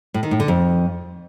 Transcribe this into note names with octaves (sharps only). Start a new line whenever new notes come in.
A2
D#3
A2
D3
F2